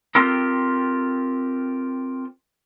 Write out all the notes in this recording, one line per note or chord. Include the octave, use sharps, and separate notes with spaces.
C4 F4 G4 A4 A#4